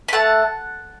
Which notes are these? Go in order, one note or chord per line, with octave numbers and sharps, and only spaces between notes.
B5
A3 F#5 A5